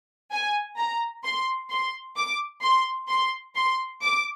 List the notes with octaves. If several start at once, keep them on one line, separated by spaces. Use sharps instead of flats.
G#5
A#5
C6
C6
D6
C6
C6
C6
D6